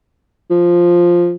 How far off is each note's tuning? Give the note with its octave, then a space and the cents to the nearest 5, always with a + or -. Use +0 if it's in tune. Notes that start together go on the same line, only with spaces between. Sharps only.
F3 +0